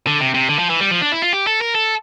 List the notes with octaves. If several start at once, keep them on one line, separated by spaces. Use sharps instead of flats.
D3
C3
C3
D3
F3
E3
G3
F3
D4
E4
F4
G4
A4
A#4
A4